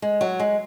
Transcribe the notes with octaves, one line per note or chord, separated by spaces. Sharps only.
G#3
F#3
G#3